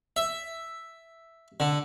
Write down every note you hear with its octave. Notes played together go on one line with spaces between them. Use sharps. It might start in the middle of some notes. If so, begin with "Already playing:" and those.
E5
D3